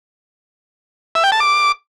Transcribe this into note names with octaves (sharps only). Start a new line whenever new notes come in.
E5
G5
A5
D6